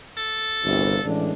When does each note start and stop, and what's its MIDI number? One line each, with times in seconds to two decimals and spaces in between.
0.18 1.05 69
0.64 0.98 31
0.64 0.98 36
1.04 1.33 33
1.04 1.33 56
1.04 1.33 62